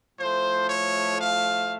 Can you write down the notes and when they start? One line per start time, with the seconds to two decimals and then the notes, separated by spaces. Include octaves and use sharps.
0.18 A2 F3 A3 C5
0.70 C#5
1.21 F5